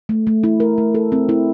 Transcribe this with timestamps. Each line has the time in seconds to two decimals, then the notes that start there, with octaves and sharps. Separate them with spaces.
0.09 A3
0.27 A3
0.44 E4
0.60 A#4
0.78 A3
0.95 A4
1.12 C4
1.29 E4